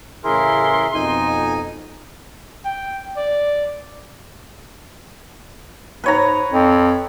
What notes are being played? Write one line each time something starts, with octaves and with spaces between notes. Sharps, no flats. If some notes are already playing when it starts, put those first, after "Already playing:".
A1 C#3 C#4 E4 G#4 A#4 C6
F2 B2 D#4 G#5
G5
D5
G#2 B4 C#5 A#5
F2